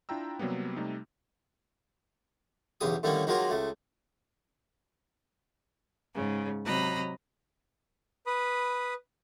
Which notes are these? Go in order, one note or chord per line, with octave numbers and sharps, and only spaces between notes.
D4 E4 F4 G5 A#5 E6
C3 F#3 G3 A#3 B3
C3 G3 A3 D#4
B1 E2 C#3 G4 D#6
A2 D3 D#3 G3 A#3 C#4
D#3 F#3 G#3 A#3 F4 A#4
C#2 A3
G#2 C#3
C3 F#3 D#5 A#5 B5 F#6
B4 B5 D#6